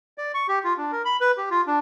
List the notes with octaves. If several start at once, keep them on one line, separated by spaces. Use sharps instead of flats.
D5
C#6
G4
F4
D4
A#4
B5
B4
G4
F4
D4